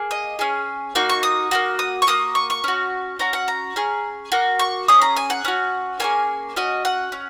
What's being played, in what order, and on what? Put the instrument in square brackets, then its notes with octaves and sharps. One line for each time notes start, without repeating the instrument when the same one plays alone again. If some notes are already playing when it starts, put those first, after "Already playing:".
Already playing: [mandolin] A#3 G#4
D#5
C#4 G#4
A#3 D#4 F#4
C#6
D#6
A#3 D#4 F#4
D#6
C#6
A#3 F#4 D#6
C#6
C#6
C#4 F#4
C#4 F#4 A#5
F#5
A#5
C#4 G#4
A#3 F#4
C#6
C#4 G#4 D#6
A#5
G#5
F#5
C#4 F#4
A#3 C#4 G#4 G#5
C#4 F#4 D#5
F#5
C#4